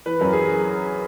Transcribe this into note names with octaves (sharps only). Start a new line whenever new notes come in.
E3 B4
F#2 A#4
G#4